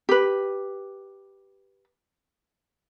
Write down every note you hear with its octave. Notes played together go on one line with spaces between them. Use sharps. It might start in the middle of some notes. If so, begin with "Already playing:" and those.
G4 B4